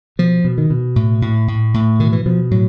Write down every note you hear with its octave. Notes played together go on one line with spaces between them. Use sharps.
B2 F3
B2
D#3
B2
A2
A2
A2
A2
B2 D#3
E3
B2 F3
A2 F#3